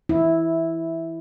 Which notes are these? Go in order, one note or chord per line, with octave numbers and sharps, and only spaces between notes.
E4